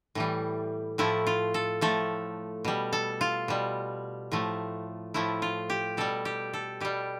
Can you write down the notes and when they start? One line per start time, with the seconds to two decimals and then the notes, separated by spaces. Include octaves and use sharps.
0.15 A2 E3 G3
0.98 A2 F3 A3 E4
1.27 F4
1.54 A4
1.81 A2 F3 A3 A4
2.65 B2 G3
2.93 A4
3.21 F4
3.48 B2 G3
4.32 A2 F3 A3
5.14 A2 F3 A3 E4
5.42 F4
5.70 G4
5.97 B2 G3 A4
6.25 G4
6.54 A4
6.81 B2 G3 G4